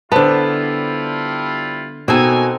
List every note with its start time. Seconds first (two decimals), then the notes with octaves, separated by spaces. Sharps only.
0.12 D3 G3 B3 E4 F4 C5 A5
2.08 B2 A#3 C4 D#4 A4 G#5